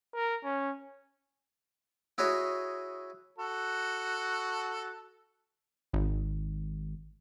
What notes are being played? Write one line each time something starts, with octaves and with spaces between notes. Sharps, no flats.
A#4
C#4
E4 F#4 G#4 C#5 D#5
F#4 A4
G#1